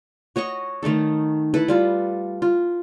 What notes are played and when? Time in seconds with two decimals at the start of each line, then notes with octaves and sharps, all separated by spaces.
0.36 F#4 C#5 D#5 C#6
0.83 D#3 A3 D#4 A4
1.54 E4 A4 B4
1.68 G3 F4 A4
2.42 F4